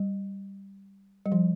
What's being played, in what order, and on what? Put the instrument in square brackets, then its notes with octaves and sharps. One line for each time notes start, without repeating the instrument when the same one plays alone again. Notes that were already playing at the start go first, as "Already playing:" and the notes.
Already playing: [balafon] G3
G3
F3